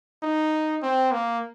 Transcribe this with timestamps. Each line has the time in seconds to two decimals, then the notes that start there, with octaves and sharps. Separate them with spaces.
0.23 D#4
0.82 C4
1.12 A#3